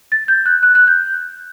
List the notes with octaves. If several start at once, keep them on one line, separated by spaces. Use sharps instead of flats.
A6
G6
F#6
F#6
F#6
G6